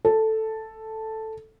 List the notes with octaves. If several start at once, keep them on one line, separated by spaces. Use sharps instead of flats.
A4